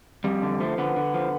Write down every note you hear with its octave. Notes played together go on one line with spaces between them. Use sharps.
F2 G3
D3
F3 A3
D3 B3
D3
F3